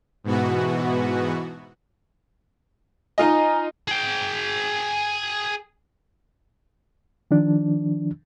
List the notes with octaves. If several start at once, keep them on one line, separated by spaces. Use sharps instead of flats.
G#2 B2 E3 B3 F#4
D#4 F4 D#5 G#5 A#5
G#4 G5
D#3 F3 D4